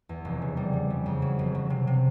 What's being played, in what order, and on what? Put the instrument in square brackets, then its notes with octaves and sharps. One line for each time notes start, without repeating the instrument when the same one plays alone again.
[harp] E2
F1
C#3
G3
G3
C#3
F2
F#3
F1
F#3
C3
C3